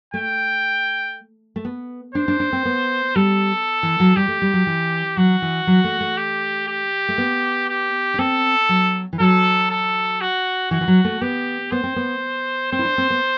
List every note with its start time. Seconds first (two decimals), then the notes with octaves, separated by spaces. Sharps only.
0.14 A3 G5
1.56 A3
1.65 B3
2.15 D4 C5
2.28 D4
2.40 D4
2.53 C4
2.65 B3
3.16 G3 A4
3.83 E3
4.00 F#3
4.16 G3 G4
4.28 A3
4.42 G3
4.54 F#3
4.67 E3
5.17 F#3 F#4
5.42 E3
5.67 F#3
5.84 A3
6.01 A3
6.17 G4
6.68 G4
7.09 A3
7.18 B3
7.69 G4
8.14 D4
8.19 C4 A4
8.69 F#3
9.13 E3
9.20 F#3 A4
9.70 A4
10.21 F#4
10.71 E3 F#4
10.81 E3
10.88 F#3
11.05 A3
11.21 B3 G4
11.71 B3 C5
11.84 C4
11.96 B3
12.72 C4 C5
12.79 E4
12.85 D4
12.98 C4
13.10 B3